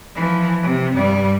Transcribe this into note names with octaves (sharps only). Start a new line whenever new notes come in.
E3 F3
C3
G2 G3